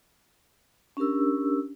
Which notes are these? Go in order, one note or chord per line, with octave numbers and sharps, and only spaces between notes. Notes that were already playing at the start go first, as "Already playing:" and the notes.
C#4 D4 G4 A#4 E6